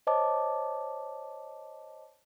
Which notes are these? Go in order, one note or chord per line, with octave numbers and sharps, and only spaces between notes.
C5 C#5 D#5 A5 D6